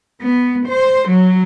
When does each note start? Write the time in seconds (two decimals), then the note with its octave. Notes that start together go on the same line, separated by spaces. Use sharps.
0.21 B3
0.68 C5
1.08 F#3